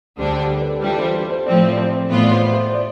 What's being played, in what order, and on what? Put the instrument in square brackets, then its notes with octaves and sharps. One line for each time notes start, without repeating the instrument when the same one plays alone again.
[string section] D2 D3 G3 D4 [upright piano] C5
[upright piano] G4
A4
B4
A4
G4
[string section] E3 G3 D4 [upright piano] F4
[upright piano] C5
C5
C5
[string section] A2 F3 C4 [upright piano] D5
[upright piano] D5
C5
[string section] A2 E3 B3 F4
[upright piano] D5
C5
C5
D5